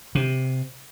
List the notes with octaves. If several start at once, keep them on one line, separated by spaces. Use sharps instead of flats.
C3